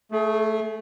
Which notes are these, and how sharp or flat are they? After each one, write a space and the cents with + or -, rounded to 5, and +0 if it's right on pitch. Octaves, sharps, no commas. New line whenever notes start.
A3 +0 G#4 +35